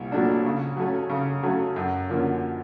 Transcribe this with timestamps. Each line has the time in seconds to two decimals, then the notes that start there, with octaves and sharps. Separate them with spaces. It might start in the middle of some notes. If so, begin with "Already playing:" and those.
Already playing: C2 A#2
0.12 A#2 F#3 A3 D4
0.45 C#3
0.77 F#3 A3 C#4
1.09 C#3
1.43 F#3 A3 C#4
1.76 F#2
2.09 D3 F3 A#3 C#4